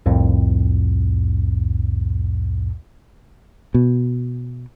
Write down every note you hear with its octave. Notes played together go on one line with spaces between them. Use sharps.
C2 F2 A2
B2